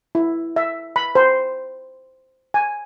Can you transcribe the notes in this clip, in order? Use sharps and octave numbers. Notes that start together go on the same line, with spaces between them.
E4
E5
B5
C5
G#5